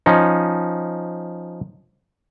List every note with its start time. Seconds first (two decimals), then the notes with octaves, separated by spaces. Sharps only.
0.06 F3 C#4 D#4